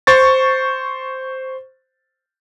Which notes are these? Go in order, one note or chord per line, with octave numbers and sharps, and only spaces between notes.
C5 C#6 A6